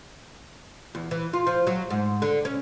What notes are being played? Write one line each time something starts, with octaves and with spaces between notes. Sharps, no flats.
E2
E3
F4
F3
F#3
G#2
D3
C#4